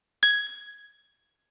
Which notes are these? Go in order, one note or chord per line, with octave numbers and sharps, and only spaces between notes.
G#6